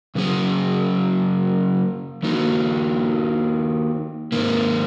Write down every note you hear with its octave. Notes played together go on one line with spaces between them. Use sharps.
C#3 F#3 C#4 G#4
D#3 A#3 D#4 F#4
G#2 D#3 A#3